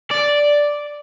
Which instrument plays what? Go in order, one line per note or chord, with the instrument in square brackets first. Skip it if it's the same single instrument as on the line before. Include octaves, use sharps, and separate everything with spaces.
[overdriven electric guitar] D5